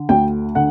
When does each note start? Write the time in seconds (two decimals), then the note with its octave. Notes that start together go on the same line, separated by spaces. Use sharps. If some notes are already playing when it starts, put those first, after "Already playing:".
Already playing: D3
0.09 D2 G5
0.55 D3 F#5